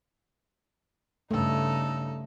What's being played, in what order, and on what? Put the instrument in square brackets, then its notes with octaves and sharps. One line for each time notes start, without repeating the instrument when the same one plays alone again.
[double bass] G2 C#3 [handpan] A3 [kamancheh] D#4 A4